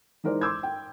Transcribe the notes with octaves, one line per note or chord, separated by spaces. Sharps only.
E3 G#3 D#4 A#4 C5 D5
C6 D6 E6 G6 G#6
G5